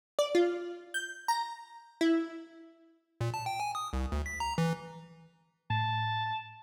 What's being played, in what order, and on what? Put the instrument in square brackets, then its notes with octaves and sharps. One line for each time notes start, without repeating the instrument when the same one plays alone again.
[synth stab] D5
F4
G6
A#5
E4
[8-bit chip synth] A#2
A5
G5
G#5
D#6
C2
D2
B6
A#5
E3
[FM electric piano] A2 [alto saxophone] A5